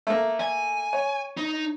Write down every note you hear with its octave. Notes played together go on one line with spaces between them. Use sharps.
A3 A#3
G#5
C#5
D#4